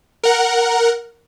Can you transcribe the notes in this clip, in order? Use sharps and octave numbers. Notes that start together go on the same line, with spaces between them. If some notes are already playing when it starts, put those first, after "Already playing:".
A#4 F#5